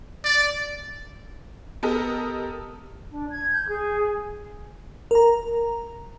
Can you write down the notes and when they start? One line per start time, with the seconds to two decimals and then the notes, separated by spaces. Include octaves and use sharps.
0.24 D5
1.83 B3 G4 A4 A#4 D#5
3.11 D4
3.30 G#6
3.52 G6
3.68 G#4
5.11 A#4 A#5